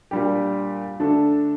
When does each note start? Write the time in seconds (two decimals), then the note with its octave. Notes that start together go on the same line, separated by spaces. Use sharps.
0.11 A#2 G3 D4 G4
1.00 D3 A3 D4 A4